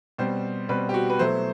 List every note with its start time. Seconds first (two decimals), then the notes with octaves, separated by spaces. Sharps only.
0.18 B2 G3 C4 C5
0.69 B2 G3 C4 B4
0.89 G4
0.94 F#4
1.10 B4
1.19 B2 F#3 A3 E4 C5